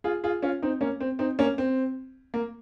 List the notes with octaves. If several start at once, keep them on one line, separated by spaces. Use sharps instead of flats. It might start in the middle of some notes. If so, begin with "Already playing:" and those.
F4 G#4
F4 G#4
C#4 F4
C4 D#4
A#3 C#4
C4
C4 D#4
A#3 C#4
C4
A#3